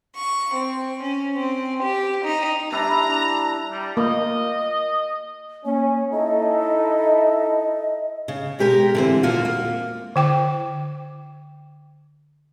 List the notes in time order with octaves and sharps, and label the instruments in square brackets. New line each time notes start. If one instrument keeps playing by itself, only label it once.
[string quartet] C#6
C4
C#4
C4
G4
D#4
[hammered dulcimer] G3 D4 E4 [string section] A#5
[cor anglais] G3
[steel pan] A#3 [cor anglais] D#5
[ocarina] A#3 [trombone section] C#4
[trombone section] D#4 E4 A4 [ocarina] D#5
[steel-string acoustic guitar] C#3
B2 G#3 G4 G#4 A#4
D3 E3 C4
D#2 A#2 A#3 F4 F#4
A#3
[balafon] D3 G5 D6